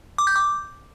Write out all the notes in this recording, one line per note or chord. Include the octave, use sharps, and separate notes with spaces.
D6
G6
D6